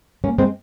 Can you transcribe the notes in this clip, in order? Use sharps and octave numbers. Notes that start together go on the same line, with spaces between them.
A#3 C#4
G#3 C4